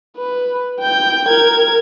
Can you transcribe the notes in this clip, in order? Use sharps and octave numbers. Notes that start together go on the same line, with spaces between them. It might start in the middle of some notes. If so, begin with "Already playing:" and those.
B4
G5 G6
A#4 G#6